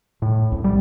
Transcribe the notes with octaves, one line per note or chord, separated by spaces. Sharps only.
A2
C2
G3